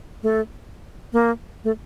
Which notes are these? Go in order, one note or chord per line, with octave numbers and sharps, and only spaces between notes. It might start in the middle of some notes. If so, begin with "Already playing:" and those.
A3
A#3
A3